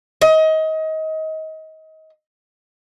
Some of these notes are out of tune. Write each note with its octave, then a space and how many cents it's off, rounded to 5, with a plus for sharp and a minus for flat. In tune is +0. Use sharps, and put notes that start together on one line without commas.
D#5 +25